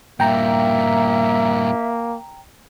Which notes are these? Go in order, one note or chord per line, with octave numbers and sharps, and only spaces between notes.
G2 A#2 A#3 E5 G5 A#5